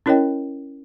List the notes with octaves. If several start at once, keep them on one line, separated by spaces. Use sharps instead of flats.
C#4 E4 A#4 C#5 D#5 G5